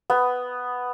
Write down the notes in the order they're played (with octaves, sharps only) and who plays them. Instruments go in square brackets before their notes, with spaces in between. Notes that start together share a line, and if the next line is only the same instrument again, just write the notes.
[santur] B3